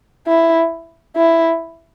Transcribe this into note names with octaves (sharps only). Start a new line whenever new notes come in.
E4
E4